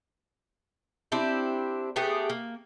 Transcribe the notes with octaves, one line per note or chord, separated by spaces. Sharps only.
C4 D4 E4 G4
A3 B3 G4 G#4
A#3